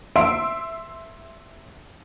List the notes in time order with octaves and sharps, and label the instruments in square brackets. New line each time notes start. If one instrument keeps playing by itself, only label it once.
[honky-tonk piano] E5 C6 E6 D7